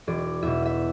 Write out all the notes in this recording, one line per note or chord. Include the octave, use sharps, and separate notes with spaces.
E1 D5
E2 B2 E5
E5